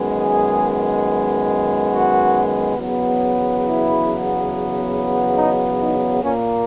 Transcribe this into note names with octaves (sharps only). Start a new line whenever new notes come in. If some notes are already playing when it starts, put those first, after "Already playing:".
Already playing: F#2 D#3 G#3 B3
G#4
F#4
E2 C#3 F#3 B3
E4
D#4
D#4
A#2 A#3 C#4